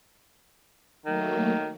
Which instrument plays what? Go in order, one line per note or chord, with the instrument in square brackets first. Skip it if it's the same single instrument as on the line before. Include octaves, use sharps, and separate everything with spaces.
[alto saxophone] D#3 [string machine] F#3 A3 A#3